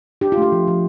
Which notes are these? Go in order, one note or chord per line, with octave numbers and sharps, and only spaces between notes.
D4 G4
F4
A3 G4
F3
F3